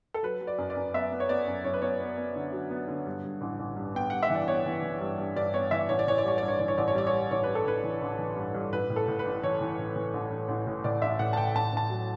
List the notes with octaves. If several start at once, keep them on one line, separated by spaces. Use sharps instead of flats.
A4
F#3 B4
F#3
D5
F#2
D5
F#2
B3 E5
B3
C#5
B3 D5
F#2
F#2 C#5
B4
B3 C#5
B3
B3
D3
F#3
B3
D3
G2
G2
A1
A1
G2
B3 G5
G2 F#5
E5
E3
D5
B3 C#5
E3
E3
G2
G2
G2 D5
B3 C#5
E3 E5
A1 C#5
D5
E3 C#5
D5
G3 C#5
G2 D5
C#5
E3 D5
C#5
A1 D5
C#5
G3 D5
C#5
G3
A1 C#5
G3 B4
A4
A1 B4
E3
A1
E3
G2
G2
A1 B4
A2
A4
A2
B4
A1
E3 C#5
E3
A1
E3
A1
A1
A1
A2
A2 D5
A1 E5
A2 F#5
A5
A2 G5
A1 A5
A1 A5
F#3